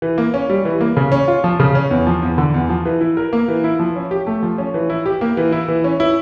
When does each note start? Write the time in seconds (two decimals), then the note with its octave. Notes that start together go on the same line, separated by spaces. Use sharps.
0.02 E3
0.18 A#3
0.34 C#4
0.50 G3
0.65 E3
0.81 A#3
0.97 C#3
1.12 C#4
1.28 F4
1.44 F3
1.60 C#3
1.75 C#4
1.91 E2
2.07 F3
2.22 E2
2.38 D3
2.54 E2
2.69 F3
2.85 E3
3.01 E4
3.17 A#4
3.33 A#3
3.48 E3
3.64 E4
3.79 F3
3.96 C#4
4.11 G4
4.27 A3
4.43 F3
4.58 C#4
4.74 E3
4.90 E4
5.06 G4
5.21 A#3
5.37 E3
5.52 E4
5.68 E3
5.84 C#4
6.00 E4